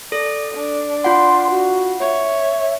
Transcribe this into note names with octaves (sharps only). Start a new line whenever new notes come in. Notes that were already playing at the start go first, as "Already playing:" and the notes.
A4 D5
D4
F4 F#5 C6
F#4
C#5 E5